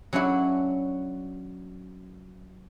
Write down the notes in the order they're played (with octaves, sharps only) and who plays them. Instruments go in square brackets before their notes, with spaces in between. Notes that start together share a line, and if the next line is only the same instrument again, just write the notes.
[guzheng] F#3 C#4 D4 E4 F#4